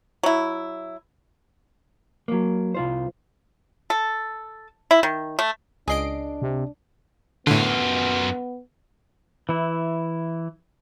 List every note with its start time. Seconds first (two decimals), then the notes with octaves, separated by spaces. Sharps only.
0.23 F#3 E4
2.28 F#3 A#3
2.75 C2 F4 C5
3.90 A4
4.91 E4
5.03 D#3
5.39 A3
5.88 C#2 D4 G#4 D#5 C7 D7
6.42 C3
7.47 F#2 A2 D3 B3 F4
9.49 E3 E4